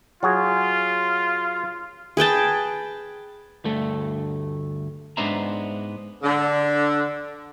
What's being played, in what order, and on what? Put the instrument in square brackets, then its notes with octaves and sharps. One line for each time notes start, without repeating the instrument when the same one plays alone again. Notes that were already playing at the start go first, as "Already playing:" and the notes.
[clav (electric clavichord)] F#3 F#4 G#4 [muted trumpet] F4
[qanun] G#4 B4 G5 A5
[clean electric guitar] D2 G2 A3 A4
G#2 B3 D4 C5 E5 A#5
[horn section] D3